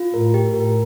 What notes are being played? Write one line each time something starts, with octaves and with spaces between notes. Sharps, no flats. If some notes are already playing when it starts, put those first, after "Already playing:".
Already playing: F4
A2 A#4
G4
A2 A#4